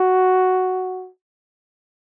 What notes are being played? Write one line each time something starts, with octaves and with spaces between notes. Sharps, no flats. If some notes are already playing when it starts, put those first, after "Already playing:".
Already playing: F#4